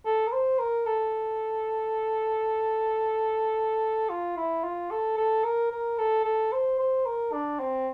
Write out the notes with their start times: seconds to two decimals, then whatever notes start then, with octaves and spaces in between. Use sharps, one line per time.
0.06 A4
0.27 A#4
0.33 C5
0.59 A#4
0.86 A4
4.09 F4
4.37 E4
4.64 F4
4.90 A4
5.17 A4
5.44 A#4
5.71 A#4
5.98 A4
6.25 A4
6.52 C5
6.79 C5
7.06 A#4
7.32 D4
7.59 C4